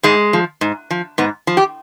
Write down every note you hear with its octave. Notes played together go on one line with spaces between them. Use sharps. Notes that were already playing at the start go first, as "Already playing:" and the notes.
G#2 G#3
F3
G#2
F3
G#2 B3
F3
G4